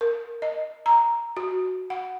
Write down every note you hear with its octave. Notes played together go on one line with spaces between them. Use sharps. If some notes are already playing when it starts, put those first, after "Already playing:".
A#4
D#5
A#5
F#4
F#5